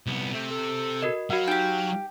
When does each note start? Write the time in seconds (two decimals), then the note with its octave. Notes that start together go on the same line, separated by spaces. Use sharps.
0.07 C2 B3
0.33 C3 A3 C4
0.51 A4
1.02 F#4 A#4 D#5
1.30 F#3 F#4 F5 F#5
1.47 D#4 G4 G5